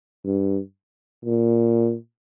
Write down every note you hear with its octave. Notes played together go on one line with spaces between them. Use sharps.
G2
A#2